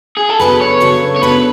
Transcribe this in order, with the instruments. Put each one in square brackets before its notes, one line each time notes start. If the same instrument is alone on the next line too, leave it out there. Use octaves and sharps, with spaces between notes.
[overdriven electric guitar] G#4
A4
[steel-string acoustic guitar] C#3 F#3 B3 D4 A4 [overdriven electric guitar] B4
[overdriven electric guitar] C#5
[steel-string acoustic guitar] C#3 F#3 B3 D4 A4
[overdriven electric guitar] C#5
[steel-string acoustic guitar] C#3 F#3 B3 D4 A4 [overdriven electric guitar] B4